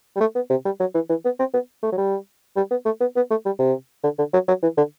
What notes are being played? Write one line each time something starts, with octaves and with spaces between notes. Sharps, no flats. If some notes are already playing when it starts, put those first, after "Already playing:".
G3
A3
B3
C3
G3
F#3
E3
E3
B3
C4
B3
A3
F#3
G3
G3
B3
A3
B3
B3
A3
G3
C3
D3
D3
F#3
F#3
E3
D3